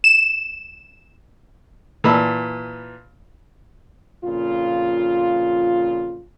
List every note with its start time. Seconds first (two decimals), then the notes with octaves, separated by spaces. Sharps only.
0.04 E7
2.04 A#2 E3 A5 B5 E6
4.24 F2 A#2 C#3 F4